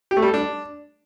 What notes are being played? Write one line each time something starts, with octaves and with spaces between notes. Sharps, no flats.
G4
A3
G3
A4
D4